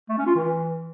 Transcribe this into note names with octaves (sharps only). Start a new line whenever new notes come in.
A3
C#4
F4
E3